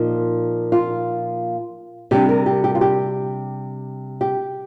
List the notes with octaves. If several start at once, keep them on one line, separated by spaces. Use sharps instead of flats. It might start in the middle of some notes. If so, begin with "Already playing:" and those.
Already playing: A#2 F3 A#3 D#4
F4
C3 G3 D4 G4
A#4
G4
G4
F4
G4
G4